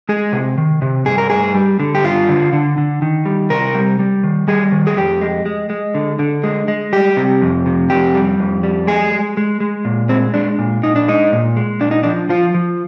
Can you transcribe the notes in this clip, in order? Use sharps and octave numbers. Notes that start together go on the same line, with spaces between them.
G#3 G#4
C3
D#3
C3
G2 G#4
A#4
G2 G#4
G3
D3
G4
G2 F4
D3
D3
D3
D#3
G3
C3 A#4
G3
G3
D#3
G3 G#4
D#3
G#4
F2 G4
G#3
G#3
G#3
D3
D3
G#3
G#3
G3 G4
C3
F2
C3
F2 G4
G3
F2
G3
G#3 G#4
G#3
G#3
G#3
A#2
G#3 C4
G#3 D4
A#2
A#2 D#4
D4
G#3 D#4
A#2
G#3
A#2 D4
D#4
F3 D4
F3 F4
F3